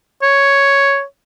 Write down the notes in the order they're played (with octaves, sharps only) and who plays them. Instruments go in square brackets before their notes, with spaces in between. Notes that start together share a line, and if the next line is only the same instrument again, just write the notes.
[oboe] C#5